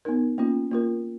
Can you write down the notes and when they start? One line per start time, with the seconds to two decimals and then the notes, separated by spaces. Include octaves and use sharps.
0.05 B3 D#4 A#4
0.38 A#3 C#4 F4
0.71 A#3 F4 A#4